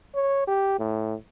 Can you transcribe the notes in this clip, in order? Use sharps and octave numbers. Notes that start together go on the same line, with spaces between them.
C#5
G4
A2